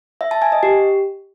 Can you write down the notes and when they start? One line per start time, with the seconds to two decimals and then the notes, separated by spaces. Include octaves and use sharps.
0.21 E5
0.31 A5
0.42 G#5
0.52 D#5
0.63 G4